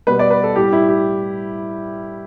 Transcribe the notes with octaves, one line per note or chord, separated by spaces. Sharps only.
B2 G3 B4
D5
B4
A4
A2 G3 G4
E4
G4